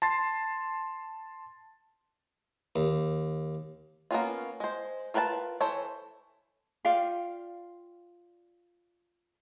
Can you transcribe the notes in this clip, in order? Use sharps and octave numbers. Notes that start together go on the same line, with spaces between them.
A5 C6 A6 C7
D#2
A#3 B3 C#4 F4
G#3 C5
F4 A#4 B4 G5 A5
E3 A4 C5 C#5
F4 D5 F5 G5